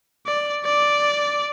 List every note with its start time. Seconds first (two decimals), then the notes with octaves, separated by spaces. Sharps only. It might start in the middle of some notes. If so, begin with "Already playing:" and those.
0.27 D5
0.65 D5